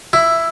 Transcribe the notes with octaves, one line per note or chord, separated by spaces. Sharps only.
E4